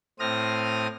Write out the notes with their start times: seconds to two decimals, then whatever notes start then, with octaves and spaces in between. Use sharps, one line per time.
0.19 A2 C4 D#6 F6 A#6